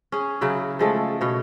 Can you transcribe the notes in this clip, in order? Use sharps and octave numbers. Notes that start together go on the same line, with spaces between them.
C#4 G#4
C#3 F#3 E4
F3 G#3 A3
B2 C#5